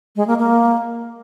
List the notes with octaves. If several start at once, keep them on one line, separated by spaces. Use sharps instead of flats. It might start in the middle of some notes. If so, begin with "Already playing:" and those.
G#3
A#3
A#3